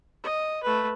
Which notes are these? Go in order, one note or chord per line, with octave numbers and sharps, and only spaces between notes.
D#5
A3 B4